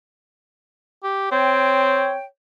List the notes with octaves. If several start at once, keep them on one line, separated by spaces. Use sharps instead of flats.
G4
C4 C#5 G5